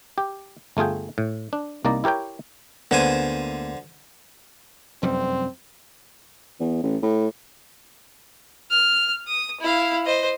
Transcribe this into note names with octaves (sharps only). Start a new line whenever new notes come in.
G4
G1 A3 F4 G#4 G5
A2
D4
C2 A#3 D#4 D5 A#5
E4 G4 A#4 C#5 G5
D2 D3 A#3 B3 C5 G#5
F1 F#2 G3 C4
E2
A1
A2
F6
D#6
E4 F5
C5 D#5